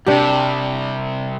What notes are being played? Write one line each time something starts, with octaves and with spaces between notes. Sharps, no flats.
C2 C3 D4 G4